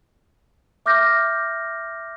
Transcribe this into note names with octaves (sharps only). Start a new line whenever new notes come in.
E5 D6 F6 G6 A#6